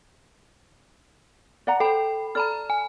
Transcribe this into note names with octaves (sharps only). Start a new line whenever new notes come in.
D5 F#5 A#5
A4 C5 G5 B5
A4 D5 A#5 B5 F6
G#5